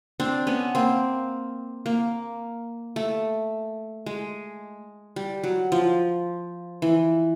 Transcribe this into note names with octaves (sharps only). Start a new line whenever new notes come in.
C4 D4
B3 C#4
A#3 C4
A#3
A3
G#3
G3
F#3
F3
E3